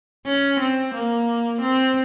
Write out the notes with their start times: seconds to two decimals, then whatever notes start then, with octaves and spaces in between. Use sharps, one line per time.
0.25 C#4
0.59 C4
0.94 A#3
1.61 C4